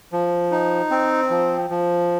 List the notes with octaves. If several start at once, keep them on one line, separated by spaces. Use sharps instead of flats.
F3
D#4
C4
F3
F3